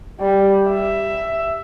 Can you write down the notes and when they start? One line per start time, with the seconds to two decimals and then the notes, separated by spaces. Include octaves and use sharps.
0.20 G3
0.71 E5